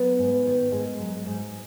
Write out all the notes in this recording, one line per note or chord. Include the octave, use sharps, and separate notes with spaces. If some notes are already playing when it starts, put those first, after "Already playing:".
Already playing: F#3 B3
G#2
D#3
G#2 G#3
F#3
G#2